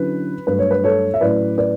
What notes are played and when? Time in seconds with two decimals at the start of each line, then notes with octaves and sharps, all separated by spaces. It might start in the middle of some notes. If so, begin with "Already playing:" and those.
Already playing: D3 F#3 C#4 E4 B4
0.47 G2 F#3 A3 B4
0.59 C#5
0.71 B4
0.84 A4 C#5
1.14 E5
1.21 A2 F#3 C#4 E4 B4 D5
1.58 B4 D5